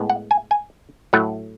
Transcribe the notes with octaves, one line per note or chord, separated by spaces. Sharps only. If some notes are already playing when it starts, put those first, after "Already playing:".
Already playing: A2 G#3 B3
F#5
G#5
G#5
A2 F#3 A3 F#5